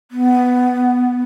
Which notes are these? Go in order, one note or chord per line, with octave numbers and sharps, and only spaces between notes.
B3